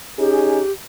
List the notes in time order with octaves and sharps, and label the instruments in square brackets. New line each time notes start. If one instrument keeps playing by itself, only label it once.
[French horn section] C#4 D#4 G#4 [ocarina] G4